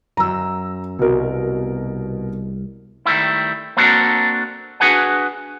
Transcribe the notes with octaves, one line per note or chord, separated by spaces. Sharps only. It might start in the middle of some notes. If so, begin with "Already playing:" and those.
F#2 A#5 E6
C2 B2 A#4
D#3 G3 A3 E4
A#3 C4 D4 F#4 A4 A#4
D4 F#4 G#4 B4 F#5 G#5